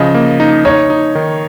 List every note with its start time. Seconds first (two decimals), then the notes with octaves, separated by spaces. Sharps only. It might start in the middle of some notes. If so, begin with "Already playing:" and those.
Already playing: C#3 F3 D#5
0.15 A#3
0.40 D#4
0.65 D#4 C#5
0.90 D#4
1.15 D#3